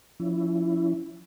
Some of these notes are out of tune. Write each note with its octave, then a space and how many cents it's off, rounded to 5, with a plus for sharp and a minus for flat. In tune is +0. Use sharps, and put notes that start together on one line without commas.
F3 +0 C#4 +30 E4 +10